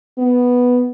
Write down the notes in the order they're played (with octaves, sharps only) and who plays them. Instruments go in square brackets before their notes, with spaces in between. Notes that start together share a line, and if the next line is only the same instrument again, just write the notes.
[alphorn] B3